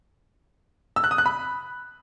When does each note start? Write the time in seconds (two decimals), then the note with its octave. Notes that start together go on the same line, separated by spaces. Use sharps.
0.96 E6
1.04 F#6
1.11 D#6
1.18 F#6
1.26 B5